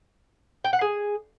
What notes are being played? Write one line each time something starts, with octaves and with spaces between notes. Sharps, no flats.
G5
F#5
G#4